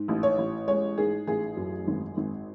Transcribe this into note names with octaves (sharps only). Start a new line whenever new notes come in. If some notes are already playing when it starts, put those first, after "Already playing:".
Already playing: G#2
A1
C#5
A1
G#3 C#5
G#2 G#4
A1 G#4
F#2
G#1
G#1